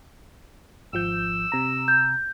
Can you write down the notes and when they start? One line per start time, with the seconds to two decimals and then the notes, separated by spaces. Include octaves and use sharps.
0.93 G#1 F3 E6 G6
1.52 C3 A#5
1.88 G6